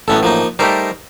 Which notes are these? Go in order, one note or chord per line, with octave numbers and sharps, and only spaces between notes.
A1 A2 F#3 B3 C#4 A4
F3 A#3 D#4
G3 A3 D#4 G4 A#4 C5